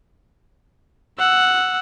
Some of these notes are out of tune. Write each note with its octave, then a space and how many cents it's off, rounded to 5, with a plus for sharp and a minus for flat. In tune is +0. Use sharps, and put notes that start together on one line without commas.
F#5 +0 E6 +0